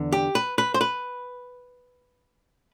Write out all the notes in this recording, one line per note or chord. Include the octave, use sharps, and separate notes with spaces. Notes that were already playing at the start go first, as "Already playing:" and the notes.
Already playing: E2 D3
G4
B4
B4
C5
B4